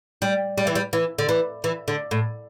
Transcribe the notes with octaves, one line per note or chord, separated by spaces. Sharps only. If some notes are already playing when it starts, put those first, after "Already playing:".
G3
G3
E3
G3
E3
D3
E3
E3
D3
A2